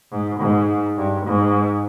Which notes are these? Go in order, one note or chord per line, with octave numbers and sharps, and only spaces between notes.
G#2
G#2
G2
G#2